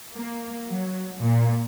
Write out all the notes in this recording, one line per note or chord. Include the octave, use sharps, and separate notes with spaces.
A#3
F#3
A#2